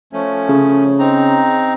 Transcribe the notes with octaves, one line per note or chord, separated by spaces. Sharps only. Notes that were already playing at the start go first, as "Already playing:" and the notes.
F3 A3 C#4
C#3
C4 D#4 A#5